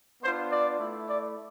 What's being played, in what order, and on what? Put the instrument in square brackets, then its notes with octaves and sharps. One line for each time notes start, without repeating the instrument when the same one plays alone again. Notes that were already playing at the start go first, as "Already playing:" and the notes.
[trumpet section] B3 D4 F4 C5
D5
A3 E4
D5